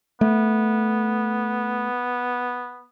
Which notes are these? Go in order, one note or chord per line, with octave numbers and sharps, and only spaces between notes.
A3 B3